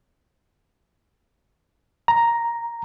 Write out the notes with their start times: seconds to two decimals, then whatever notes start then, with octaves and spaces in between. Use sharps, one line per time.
2.08 A#5